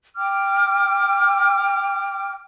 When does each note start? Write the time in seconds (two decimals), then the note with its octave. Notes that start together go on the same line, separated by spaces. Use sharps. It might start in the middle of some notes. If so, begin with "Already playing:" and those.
0.16 G5 D6 F6